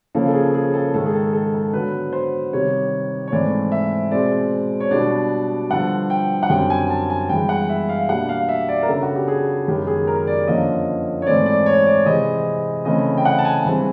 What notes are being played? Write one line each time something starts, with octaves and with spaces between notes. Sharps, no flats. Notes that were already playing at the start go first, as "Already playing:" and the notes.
C#3 F3 A#3 C#4 A4
A4
G#4
G#4
A4
G#2 D#3 G#3 A4
G#4
A4
A4
A4
D3 F#3 B3 B4
C5
C3 D#3 G3 C#5
C#5
G#2 E3 A3 C4 D5
E5
B2 G#3 C4 D5
C#5
B2 G3 B3 D4 D5
G2 D3 F3 F#5
G5
F#5
F#2 D3 G3 C4 G5
G#5
A5
G#5
G2 E3 G#3 B3 G5
F#5
E5
F5
B2 G3 A#3 D4 F#5
F5
E5
D5
A#4
C#3 F#3 B3 D4 A4
F#4
G4
G#4
F#2 D#3 G#3 B3 G4
G#4
A#4
D5
F2 D3 F3 A#3 C#4 D#5
C#5
G#2 E3 A3 C4 D5
D5
C#5
D5
C3 E3 G#3 C4 D#5
C#3 E3 A3 C4 D#5
G5
F#5
A5
G#5
G2 E3 G#3 C4